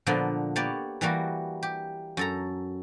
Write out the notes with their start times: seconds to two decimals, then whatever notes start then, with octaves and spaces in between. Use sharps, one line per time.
0.07 A#2 D3 F3 A#3 B3
0.56 A#3 B3 G4 C#5 D5
1.01 E3 G3 A#3 F#4
1.63 G4
2.17 F#2 A4 A#5